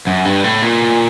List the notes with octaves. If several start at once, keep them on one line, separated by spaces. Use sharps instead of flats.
F#2
G2
A2
A#2